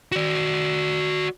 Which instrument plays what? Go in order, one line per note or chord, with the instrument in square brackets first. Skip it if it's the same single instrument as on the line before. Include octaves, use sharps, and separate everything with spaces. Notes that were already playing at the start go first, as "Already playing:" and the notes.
[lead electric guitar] F#4 D5